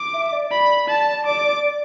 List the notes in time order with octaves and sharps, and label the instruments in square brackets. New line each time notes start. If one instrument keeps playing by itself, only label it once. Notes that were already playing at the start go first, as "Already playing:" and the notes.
Already playing: [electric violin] D6
[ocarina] E5
D5
[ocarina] D5 [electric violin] B5
[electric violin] A5
D6